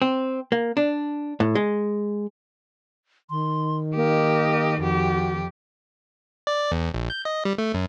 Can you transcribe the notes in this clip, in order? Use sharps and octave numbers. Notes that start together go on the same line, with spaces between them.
C4
A#3
D4
A2
G#3
D#3 C6
A#3 G4 D#5
F2 F#4 G4
D5
E2
A#1
G6
D#5
G3
A3
F#2